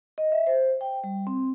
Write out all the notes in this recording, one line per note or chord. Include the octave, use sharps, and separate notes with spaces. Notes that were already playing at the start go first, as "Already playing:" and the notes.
D#5
E5
C5
G5
G3
C4